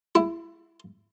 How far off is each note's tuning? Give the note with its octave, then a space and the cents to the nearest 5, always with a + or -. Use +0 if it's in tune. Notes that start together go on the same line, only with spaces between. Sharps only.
E4 +20